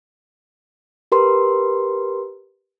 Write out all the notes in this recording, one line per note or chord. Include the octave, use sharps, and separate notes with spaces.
G4 A#4 B4 C6